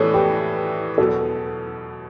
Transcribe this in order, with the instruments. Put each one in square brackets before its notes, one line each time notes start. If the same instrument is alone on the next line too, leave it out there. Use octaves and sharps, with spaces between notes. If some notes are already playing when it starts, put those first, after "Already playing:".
Already playing: [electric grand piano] A2 E3 B3 [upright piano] A4 B4 C#5 D5
[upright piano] G4 B4
[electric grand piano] E2 B2 F#3 B3 [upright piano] F#4 A4